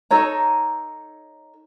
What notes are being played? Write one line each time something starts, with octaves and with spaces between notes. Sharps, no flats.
D#4 A4 C#5 A#5